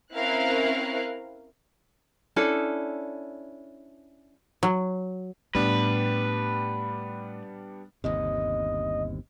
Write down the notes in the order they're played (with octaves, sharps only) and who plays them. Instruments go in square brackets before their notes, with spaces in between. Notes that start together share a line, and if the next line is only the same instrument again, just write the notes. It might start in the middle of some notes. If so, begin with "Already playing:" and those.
[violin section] C4 C#4 E4 A#4 F5 F#6
[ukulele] C#4 D4 E4 A4
[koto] F#3
[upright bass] A2 [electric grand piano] G3 B3 D4 [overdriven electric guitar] B4
[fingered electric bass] G1 D#2 C3 [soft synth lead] D#5